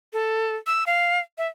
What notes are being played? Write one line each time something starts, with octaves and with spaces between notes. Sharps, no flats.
A4
E6
F5
E5